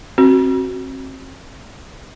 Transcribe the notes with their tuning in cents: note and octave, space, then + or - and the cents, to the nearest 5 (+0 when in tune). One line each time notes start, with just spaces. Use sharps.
C4 +35 F#4 +5